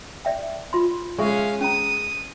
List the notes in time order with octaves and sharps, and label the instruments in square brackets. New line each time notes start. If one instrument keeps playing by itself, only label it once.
[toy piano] D5 E5 G5
F4 B5 C6
[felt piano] G#3 [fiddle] C#4 F5 [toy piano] E5 C#6
[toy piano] C#4 A#5 [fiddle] D#6